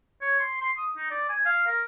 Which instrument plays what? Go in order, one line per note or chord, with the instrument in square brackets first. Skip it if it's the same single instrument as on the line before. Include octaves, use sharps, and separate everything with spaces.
[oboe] C#5
C6
C6
D#6
D#4
D5
G#5
F5
A#4